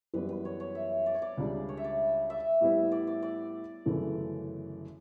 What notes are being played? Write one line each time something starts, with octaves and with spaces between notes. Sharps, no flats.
F#2 E3 G3 B3 B4
B4
C#5
C#5
E5
D5
C#5
D5
C#2 C#3 G3 D4
C#5
E5
D5
E5
A2 G3 B3 E4
D5
D5
D5
G1 F#2 C#3 E3 A3